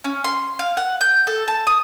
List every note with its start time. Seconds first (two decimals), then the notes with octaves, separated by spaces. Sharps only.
0.04 C#4
0.24 C6
0.59 F5
0.77 F#5
1.01 G6
1.27 A4
1.48 A5
1.67 D#6